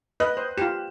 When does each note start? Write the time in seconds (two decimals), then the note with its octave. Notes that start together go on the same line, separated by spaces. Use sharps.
0.20 B4 D#5 F#6
0.37 C5
0.58 F4 G4 E7